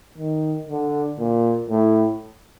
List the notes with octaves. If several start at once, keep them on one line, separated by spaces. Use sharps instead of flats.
D#3
D3
A#2
A2